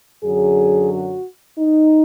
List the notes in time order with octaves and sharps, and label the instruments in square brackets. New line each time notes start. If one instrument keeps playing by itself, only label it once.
[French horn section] F#2 D3 F#3 G#4
F#4
D#4